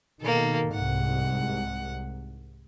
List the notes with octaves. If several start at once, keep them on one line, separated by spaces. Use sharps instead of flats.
B2 D#3 A#3 A4
C2 G#2 F#5